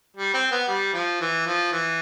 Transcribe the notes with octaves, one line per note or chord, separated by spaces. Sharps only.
G3
C4
B3
G3
F3
E3
F3
E3